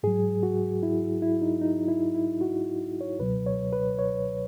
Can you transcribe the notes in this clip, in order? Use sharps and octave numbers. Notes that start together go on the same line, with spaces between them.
G#2 F#3 G#4
F#4
E4
E4
D#4
D#4
E4
E4
F#4
C#5
C#2 B2 F#3 B4
C#5
B4
C#5